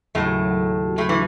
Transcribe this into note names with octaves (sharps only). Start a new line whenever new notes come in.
D#2 A2 C#3 F#3 A3
A2 A3
E3